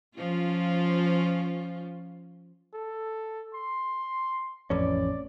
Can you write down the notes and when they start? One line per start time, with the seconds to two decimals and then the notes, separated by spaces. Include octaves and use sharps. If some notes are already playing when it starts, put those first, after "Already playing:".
0.17 F3 C#4 F4
2.73 A4
3.54 C6
4.70 A1 F2 C#4 D5